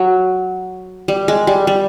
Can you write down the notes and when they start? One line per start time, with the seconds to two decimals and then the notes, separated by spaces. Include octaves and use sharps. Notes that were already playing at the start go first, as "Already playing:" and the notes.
Already playing: F#3
1.08 G3
1.28 G#3
1.47 G3
1.67 G3